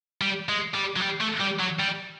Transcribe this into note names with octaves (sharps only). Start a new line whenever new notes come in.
G3
G#3
G3
F#3
G3
A3
G3
F#3
G3